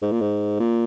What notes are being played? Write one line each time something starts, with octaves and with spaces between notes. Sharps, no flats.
G#2
A#2
G#2
A#2